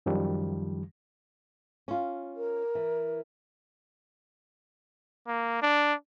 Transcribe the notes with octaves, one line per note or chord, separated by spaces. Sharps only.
F#2 D#3 F3 G3
C#4 F4
A#4
E3
A#3
D4